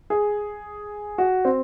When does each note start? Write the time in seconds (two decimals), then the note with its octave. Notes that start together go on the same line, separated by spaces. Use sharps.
0.10 G#4
1.18 F#4
1.45 C4